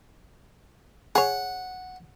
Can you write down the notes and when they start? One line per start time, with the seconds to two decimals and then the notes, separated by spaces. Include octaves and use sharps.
1.15 G#4 C#5 F#5